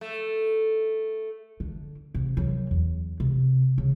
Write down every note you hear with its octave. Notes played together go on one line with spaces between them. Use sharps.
A3
D3
C3
D#3 F#3
E2
C3
C#3